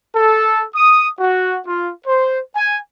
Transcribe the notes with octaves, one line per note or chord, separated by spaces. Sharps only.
A4
D#6
F#4
F4
C5
G#5